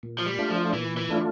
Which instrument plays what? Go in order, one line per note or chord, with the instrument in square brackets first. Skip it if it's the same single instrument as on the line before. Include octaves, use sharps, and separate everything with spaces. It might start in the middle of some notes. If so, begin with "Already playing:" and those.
[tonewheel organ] A#2
[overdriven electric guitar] F3
G3
[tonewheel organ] A3 D4 F4
[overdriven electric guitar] F3
[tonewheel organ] A#2 [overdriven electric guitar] E3
[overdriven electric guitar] E3
[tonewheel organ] A3 D4 F4